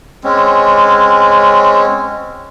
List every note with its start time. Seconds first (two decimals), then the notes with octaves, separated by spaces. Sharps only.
0.24 G#3 C4 C#4